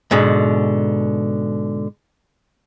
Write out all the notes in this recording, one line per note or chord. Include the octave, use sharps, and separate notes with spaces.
G#2 B2 D3